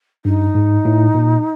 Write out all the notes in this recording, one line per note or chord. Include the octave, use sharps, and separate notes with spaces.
G2 D#4
G#2
A2
A#2